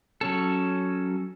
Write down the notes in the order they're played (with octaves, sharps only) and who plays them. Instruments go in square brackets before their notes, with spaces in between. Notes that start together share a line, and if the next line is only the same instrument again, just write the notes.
[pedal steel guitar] F#3 C#4 A4